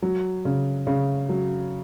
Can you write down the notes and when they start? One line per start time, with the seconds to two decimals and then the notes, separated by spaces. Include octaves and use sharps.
0.02 F#3
0.45 C#3
0.87 C#3
1.29 F#3